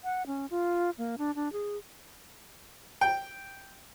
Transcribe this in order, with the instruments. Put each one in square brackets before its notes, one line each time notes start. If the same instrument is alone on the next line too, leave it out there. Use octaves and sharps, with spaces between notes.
[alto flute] F#5
C#4
F4
A#3
D4
D4
G#4
[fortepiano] G5